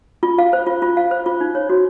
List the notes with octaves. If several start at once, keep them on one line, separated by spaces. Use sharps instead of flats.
F4
F5
C5
F4
F4
F5
C5
F4
D#4
C#5
F#4